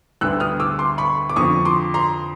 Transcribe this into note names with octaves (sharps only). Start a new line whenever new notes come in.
D2 D3 G3 B3 E6 F#6
D#6 F6
D6 E6
C6 D6
B5 C#6
D6
F2 D3 F3 C#6 D#6
C6 D6
A#5 C6